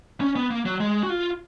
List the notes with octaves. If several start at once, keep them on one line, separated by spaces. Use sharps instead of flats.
C#4
B3
A#3
F#3
G#3
F#4
F4